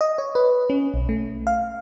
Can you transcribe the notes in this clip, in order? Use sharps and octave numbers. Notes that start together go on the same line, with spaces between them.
D#5
C#5
B4
C#4
B1
A3
F5